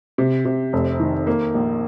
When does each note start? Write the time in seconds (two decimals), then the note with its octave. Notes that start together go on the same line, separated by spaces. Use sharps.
0.18 C3
0.45 C3
0.73 F1
1.00 D#3
1.27 A#3
1.54 A#1